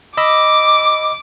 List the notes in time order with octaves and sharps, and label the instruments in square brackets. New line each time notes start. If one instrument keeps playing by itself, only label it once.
[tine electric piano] D#5 B5 E6 [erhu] D6